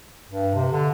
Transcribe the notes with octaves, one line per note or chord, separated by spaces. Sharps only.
G2
C3
D3